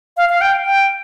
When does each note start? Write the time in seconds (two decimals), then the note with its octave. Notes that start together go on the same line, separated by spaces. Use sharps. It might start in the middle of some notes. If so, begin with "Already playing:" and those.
0.17 F5
0.29 F5
0.41 G5
0.65 G5